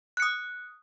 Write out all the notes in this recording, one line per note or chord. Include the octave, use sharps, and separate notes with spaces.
D#6 F#6 C#7